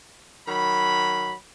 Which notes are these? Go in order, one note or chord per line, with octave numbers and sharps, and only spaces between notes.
D#3 F#3 B5